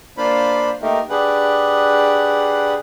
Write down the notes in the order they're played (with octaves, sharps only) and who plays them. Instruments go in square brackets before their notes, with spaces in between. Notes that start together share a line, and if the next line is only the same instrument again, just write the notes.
[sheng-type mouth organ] A#3 D4 F4 C5 F5 B5
A3 A#3 D#4 G4 A#4
D4 G4 G#4 B4 F#5